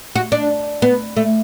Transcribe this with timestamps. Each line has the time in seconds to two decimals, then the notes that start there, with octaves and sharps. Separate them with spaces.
0.16 F#4
0.32 D4
0.82 B3
1.17 A3